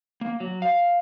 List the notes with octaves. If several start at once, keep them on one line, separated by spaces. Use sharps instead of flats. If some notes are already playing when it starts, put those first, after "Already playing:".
A#3
F#3
F5